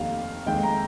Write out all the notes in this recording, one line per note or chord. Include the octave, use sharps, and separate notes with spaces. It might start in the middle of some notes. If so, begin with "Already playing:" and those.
Already playing: F1 D#2 D#3 G3 F5
F1 D#2 D#3 G#3 G5
A#5